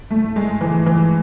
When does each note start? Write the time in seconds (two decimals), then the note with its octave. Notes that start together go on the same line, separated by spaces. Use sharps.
0.11 A3
0.36 G#3
0.61 E3
0.86 E3